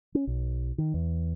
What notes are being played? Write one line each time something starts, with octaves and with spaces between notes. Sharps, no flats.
C#4
B1
D#3
E2